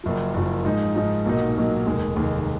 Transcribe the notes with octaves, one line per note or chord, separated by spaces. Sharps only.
F#1 F#2 F3
F#1 F#2 F3
G#2 F3 G#3 D#4
G#2 F3 G#3 D#4
B1 A#2 F#3 A#3 D#4
B1 A#2 F#3 A#3 D#4
F1 D#2 D#3 G#3
F1 D#2 D#3 G#3